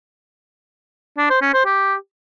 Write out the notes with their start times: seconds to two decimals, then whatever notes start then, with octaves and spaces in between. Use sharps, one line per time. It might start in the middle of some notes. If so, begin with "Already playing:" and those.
1.18 D4
1.30 C5
1.42 C#4
1.54 C5
1.66 G4